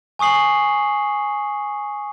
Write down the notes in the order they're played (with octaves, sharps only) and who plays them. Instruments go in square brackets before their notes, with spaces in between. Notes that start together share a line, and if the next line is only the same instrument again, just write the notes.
[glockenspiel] G#5 C#6 D#6 C7 F#7